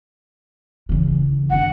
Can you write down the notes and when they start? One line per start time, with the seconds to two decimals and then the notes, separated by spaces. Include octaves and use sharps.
0.89 C#3 E3
1.50 D3 D4 F#5